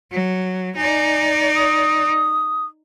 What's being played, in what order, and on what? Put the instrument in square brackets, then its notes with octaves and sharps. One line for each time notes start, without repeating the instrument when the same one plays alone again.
[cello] F#3
[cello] D#4 D5 [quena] G#5
[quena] D#6